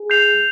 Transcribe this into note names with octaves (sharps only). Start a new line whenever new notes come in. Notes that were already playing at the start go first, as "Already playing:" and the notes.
Already playing: G#4
G6 C7 F7